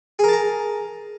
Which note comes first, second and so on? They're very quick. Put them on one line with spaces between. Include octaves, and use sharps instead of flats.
G#4 A#4 A5 A#5